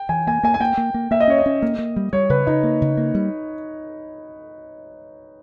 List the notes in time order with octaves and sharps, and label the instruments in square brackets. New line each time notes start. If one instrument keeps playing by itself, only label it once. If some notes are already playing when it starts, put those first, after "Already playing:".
Already playing: [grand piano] G5
[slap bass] E3 [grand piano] G#5
[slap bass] A#3 [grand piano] G#5
[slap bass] A#3 [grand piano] G#5
[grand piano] G#5
[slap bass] A#3 [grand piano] G5
[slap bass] A#3
A#3
[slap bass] A#3 [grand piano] E5
[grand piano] D#5
[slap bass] C#4 [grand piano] C#5
[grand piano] D#5
[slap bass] C#4
A#3
A#3
G3
[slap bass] G3 [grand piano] C#5
[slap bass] C#3 [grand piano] B4
[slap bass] C#3 [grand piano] D#4
[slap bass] A#3
C#3
A#3
G3